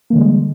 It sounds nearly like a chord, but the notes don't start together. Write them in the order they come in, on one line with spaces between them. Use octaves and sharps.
A#3 E3 D3 G3 G#3